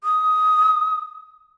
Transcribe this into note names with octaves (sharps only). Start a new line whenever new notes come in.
D#6